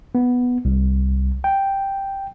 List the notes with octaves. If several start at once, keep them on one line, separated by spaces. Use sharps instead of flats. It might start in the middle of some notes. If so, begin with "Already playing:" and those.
B3
C2
G5